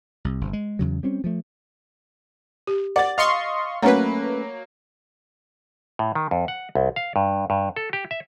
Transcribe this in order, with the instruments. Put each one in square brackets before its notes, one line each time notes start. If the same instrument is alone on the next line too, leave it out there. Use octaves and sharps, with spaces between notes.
[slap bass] C2
G1 C3
G#3
E2 C#3 F#3
G3 C4 C#4
F3 A3
[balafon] G4
[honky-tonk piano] D5 A6 [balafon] F#5
[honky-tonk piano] D#5 D#6 [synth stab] F5 C6 C#6
[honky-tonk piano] F#3 A#3 [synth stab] A3 C#4 B4 [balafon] C#5 F#5 A#5
[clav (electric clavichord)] A2
D#3
F2
F#5
C2
F5
G2
G2
A4
G4
E5